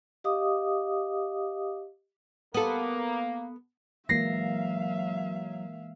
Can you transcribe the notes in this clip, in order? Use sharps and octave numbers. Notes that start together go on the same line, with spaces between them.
G4 D#5 F5 D6 D#6
A#3 B3 A4
E3 F#3 G#3 A#3 E5 F5 A#6 C7